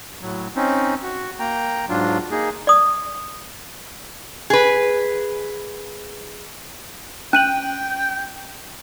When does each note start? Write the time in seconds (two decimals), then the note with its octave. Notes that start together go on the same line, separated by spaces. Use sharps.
0.22 A2 F#3
0.56 C4 C#4 D#4
1.03 F#4
1.39 A#3 G5 A#5
1.89 G#2 F#3 D4 F4
2.31 A#3 D#4 G#4
2.67 D5 D#6
4.50 G#4 B4
7.33 C#4 G5 F#6 D#7 F#7